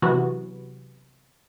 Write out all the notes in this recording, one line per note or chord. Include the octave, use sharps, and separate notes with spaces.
C3 E3 F#3 B3 F#4